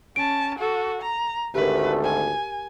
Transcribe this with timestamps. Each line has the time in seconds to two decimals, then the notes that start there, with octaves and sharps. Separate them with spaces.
0.16 C#4 A5 D7
0.59 F#4 A4
1.02 A#5
1.55 G#1 D2 A3 G4 A#4 B4
2.04 G#5